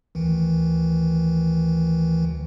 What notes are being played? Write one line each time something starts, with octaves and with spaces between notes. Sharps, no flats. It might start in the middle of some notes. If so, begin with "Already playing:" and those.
D2 D#3 E3